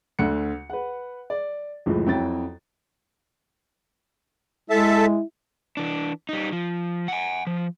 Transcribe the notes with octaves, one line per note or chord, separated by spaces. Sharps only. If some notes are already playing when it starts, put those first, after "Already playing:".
D2 D3 F#6 C#7
B4 F#5
D5
F#1 C#2 A2 E3 F3
F2 F#3 E4 F#4 G5 A6
G#3 E4 A4 E5 A5
E3 D4
G3 D#4
F3
F#5 G#5
F3